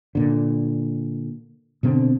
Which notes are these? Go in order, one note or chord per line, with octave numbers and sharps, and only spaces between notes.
A#2 D3
B2 D3 C4